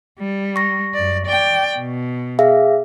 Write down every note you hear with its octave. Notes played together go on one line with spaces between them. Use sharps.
G3
C#6 A#6
F#2 D5
D5 G5
B2
G#4 E5 F5